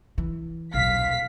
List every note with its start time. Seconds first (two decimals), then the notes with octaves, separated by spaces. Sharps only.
0.18 E3
0.74 D#1 B1 F5 B6